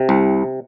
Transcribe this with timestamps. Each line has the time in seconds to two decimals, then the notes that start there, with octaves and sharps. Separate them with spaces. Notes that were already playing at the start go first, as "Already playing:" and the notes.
Already playing: C3
0.09 C2